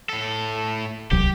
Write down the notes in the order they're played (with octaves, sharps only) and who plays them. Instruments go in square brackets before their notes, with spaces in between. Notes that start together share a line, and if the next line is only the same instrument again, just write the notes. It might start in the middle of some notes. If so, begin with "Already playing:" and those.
[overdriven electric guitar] A2 A4
[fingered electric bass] D1 C2 F#3 [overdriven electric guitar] G4